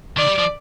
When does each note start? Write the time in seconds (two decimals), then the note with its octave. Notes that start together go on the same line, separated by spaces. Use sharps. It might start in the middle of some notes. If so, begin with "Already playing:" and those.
0.17 D#3 D5
0.28 G3
0.39 F3